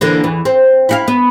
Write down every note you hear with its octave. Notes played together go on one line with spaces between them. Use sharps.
D3 E3 A#3
E2 E3
C4
E4 F#4 F5
B3